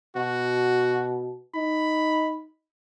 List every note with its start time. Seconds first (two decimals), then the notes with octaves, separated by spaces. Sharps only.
0.16 B2 F#4
1.55 D#4 B5